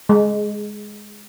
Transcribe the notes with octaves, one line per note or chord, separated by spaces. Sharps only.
G#3